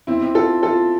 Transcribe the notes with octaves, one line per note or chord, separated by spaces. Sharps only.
C4 E4
C4
F4 A4
F4 A4